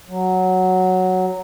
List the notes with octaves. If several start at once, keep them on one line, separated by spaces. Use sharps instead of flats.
F#3